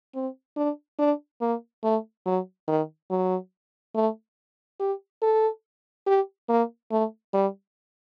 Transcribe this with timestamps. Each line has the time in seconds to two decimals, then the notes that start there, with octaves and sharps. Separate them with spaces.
0.15 C4
0.57 D4
0.99 D4
1.41 A#3
1.84 A3
2.26 F#3
2.68 D#3
3.11 F#3
3.95 A3
4.80 G4
5.22 A4
6.07 G4
6.49 A#3
6.91 A3
7.34 G3